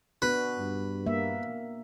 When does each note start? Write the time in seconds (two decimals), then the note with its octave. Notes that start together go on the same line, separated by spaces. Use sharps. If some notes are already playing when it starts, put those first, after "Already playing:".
0.22 B3 D4 F#4 B4
0.58 G2
1.06 A#3 E5